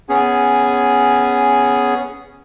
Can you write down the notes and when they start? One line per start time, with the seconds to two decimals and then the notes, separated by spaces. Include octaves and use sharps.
0.09 B3 C#4 G#4